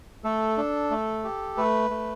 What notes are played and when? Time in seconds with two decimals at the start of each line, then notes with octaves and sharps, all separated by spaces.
0.24 A3 A4
0.57 D4
0.91 A3
1.24 G4
1.57 A3 B4
1.90 A3